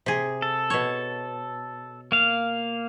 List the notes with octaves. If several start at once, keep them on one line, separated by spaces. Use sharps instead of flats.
C3 G#4
A4
B2 C#5
A#3 F5